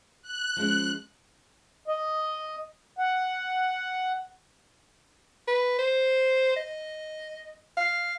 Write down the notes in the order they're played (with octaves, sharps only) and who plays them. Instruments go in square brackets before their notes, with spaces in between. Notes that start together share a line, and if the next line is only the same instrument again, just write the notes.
[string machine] F#6
[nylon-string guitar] F3 G#3 C#4
[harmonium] D#5
F#5
[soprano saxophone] B4
C5
D#5
F5